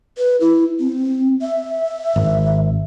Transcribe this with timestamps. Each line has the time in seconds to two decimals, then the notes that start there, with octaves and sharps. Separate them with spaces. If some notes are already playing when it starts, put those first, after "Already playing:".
0.18 B4
0.41 E4
0.80 C4
1.41 E5
2.16 G#1